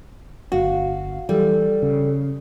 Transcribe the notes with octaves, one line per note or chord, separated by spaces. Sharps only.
G1 F#4 F5
E3 G3 A4
C#3